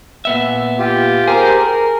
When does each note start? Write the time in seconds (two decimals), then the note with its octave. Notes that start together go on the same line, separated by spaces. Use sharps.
0.25 A#2 B3 E5
0.79 F4 G4
1.28 G4 G#4 A#4 C5
1.58 A#4